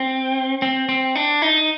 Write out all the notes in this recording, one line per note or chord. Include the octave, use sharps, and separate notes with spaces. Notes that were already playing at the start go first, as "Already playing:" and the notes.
Already playing: C4
C4
C4
D4
D#4